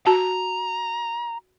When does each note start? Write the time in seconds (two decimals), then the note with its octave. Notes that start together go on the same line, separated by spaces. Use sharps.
0.06 F#4 A5 A#5